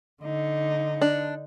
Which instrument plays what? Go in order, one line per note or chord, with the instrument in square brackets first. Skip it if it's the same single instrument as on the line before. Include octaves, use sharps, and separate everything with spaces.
[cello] D3 D#4
[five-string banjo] D4